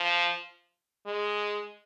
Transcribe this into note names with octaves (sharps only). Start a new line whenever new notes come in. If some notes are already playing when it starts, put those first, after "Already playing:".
Already playing: F3
G#3